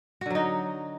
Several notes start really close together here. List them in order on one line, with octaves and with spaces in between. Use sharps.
F#4 D3 F#3 D#4